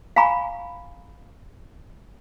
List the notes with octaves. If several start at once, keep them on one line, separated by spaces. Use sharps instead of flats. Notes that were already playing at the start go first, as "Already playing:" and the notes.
F5 G#5 A#5 B5 C#6